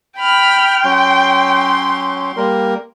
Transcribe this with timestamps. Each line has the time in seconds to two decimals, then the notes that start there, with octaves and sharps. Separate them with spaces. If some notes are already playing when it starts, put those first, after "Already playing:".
0.19 G5 B5 F6
0.85 F#3 C#4 C6
2.37 G3 A#3 A#4